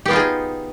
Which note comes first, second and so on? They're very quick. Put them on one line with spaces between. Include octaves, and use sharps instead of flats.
G4 B3 F4 D#4 G#4